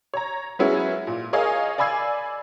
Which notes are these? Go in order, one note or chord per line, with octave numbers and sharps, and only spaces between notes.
C#5 A#5
F#3 G#3 B3 C#4 E4 G#4
A#2
G#4 A#4 C#5 D#5 F5 G#5
D5 G#5 B5 E6 G#6 C7